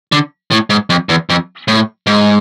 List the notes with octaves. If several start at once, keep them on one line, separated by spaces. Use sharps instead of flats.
D3
A2
G#2
F2
E2
F2
A2
G#2